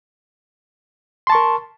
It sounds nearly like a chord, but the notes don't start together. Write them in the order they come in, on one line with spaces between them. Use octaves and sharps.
C6 A5 C#6 A#4